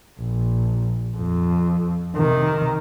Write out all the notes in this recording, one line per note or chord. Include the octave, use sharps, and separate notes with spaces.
A#1
F2
C3 D#3